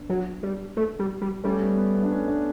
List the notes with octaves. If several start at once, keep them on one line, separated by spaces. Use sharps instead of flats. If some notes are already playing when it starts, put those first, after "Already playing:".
Already playing: B3 D4
F#3
G3
A3
G3
G3
G3 A3 C#4
B3
B3
B3
D4
A3 C#4
B3 D4